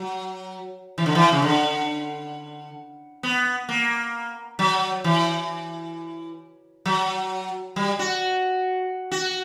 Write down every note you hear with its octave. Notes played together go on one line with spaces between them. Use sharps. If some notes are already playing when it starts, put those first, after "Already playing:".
Already playing: F#3
E3
D3
E3
C#3
D3
B3
A#3
F#3
E3
F#3
G3
F#4
F#4